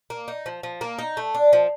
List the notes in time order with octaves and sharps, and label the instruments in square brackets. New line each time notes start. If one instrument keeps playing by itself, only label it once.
[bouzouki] A#3
D#4
F3
F3
A#3
D#4
A3
D4
F3